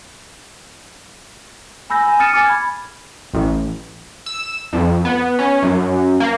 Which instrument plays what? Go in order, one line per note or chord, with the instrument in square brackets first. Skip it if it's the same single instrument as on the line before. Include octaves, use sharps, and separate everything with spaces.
[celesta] G#5 B5 E6 G6 A#6
G#5
D#6 F6 A6 C#7 D#7 E7
G#5 D6 F6 A6
B5 G#6
[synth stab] A1
[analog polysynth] E6
F2
B3
C#4
F#2
A#3